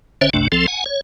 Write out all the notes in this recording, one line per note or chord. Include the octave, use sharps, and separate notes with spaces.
G#1 D3 C#4 C5 C#5 E5
G1 C2 F#2 C3 A3 D4
C2 F3 C4 A4
F#5 G#5
C#5